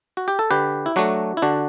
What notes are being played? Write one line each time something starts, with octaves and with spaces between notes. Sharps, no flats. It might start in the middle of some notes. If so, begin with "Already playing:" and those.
F#4
G4
A4
D3 G4 B4
E4
F#3 A3 D4 F#4
E4
D3 D4 F#4